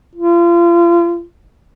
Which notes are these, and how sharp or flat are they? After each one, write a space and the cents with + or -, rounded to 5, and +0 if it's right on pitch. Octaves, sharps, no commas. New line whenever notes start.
F4 -35